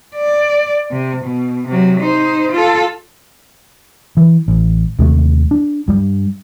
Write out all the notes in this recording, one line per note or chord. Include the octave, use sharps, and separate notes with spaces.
D5
C3
B2
C3 F#3
D#4 C5
F4 A4
E3
A1
D#2 C3 A3
D4
G2 G3